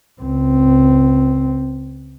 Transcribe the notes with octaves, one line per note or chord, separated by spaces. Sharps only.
C#2 C4